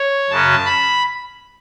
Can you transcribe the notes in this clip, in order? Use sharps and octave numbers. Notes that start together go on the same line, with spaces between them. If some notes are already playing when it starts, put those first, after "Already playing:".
Already playing: C#5
F#2 C#3 F#3 C#4 A5
B5